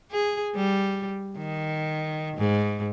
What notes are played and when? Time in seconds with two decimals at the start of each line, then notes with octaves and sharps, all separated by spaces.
0.12 G#4
0.56 G3
1.38 D#3
2.37 G#2